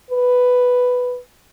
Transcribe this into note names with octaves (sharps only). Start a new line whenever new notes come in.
B4